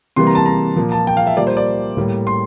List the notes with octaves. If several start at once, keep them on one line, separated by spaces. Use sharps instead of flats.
C3 E3 G3 A#3 C6
A#5
A5
A#5
A#2 F3 A#3
A5
G5
F5
E5
A#2 G3 A#3 D5
C5
D5
A2 G3 A#3
C6